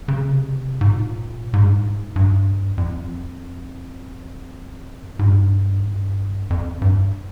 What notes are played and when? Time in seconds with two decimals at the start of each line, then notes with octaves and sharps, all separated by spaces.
0.08 C#3
0.29 C3
0.81 G#2
0.91 A#2
1.53 G#2
1.63 G2
1.72 G#2
2.16 G2
2.78 F2
5.19 G#2
5.26 G2
5.80 G#2
5.88 G2
6.50 F2
6.82 G2